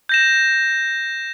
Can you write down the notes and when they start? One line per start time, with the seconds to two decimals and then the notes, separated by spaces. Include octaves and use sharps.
0.09 G6 A#6 E7